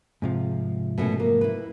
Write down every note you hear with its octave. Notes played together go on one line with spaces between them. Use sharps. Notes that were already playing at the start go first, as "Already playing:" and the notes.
G#2 C3 F3
B2 A3 C#4
A#3
E4 B4